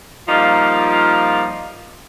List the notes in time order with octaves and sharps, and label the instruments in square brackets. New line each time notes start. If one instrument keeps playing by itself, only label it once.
[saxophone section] F3 G3 A#3 D#4 F4